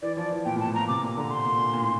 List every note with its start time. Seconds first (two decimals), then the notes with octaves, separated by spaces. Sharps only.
0.02 E3 D5
0.17 F3 D5
0.31 E3
0.45 A#2 G5
0.56 A2
0.60 A5
0.67 A2
0.74 A#2 A#5
0.88 C3 D6
1.02 A#2
1.17 D3 A#5
1.30 C6
1.45 A#2
1.59 A#2
1.74 A#2
1.81 A2